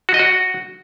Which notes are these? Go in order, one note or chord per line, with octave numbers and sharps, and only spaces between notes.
F#4
D#5
F#4